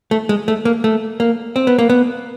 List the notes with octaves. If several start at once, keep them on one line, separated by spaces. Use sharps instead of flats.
A3
G#3
A3
A#3
A3
A#3
C4
B3
A#3
B3